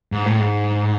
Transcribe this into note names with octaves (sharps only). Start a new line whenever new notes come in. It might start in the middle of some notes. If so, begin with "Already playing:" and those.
G#2
A2
G#2